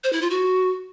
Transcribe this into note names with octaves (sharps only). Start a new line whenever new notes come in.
C5
E4
F4
F#4